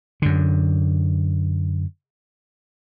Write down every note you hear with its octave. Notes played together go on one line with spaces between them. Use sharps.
F#2 D3